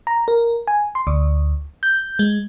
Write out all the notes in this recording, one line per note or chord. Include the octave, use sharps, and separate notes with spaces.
A#5
A#4
G#5
C6
D2
G6
G#3